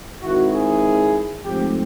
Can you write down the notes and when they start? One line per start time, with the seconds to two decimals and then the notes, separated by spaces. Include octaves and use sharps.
0.22 D#3 G#3 C4 E4 F#4
0.52 G#4
1.44 G#2 F3 A3 C4 G4